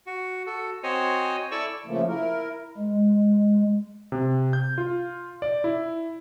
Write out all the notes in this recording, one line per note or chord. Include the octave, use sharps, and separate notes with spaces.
F#4
F#4 A4
C4 F#4 C5 C#5 D#5 G#5
E4 A4 D5 C#6 E6
C#3 F3 A3 A#3
E4 A#4
G#3
C3
G6
F4
D5
E4